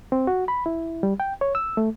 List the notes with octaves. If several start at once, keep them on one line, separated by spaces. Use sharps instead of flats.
C4
F#4
B5
E4
G3
G5
C#5
E6
A3